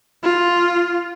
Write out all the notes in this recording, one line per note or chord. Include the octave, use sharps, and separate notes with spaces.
F4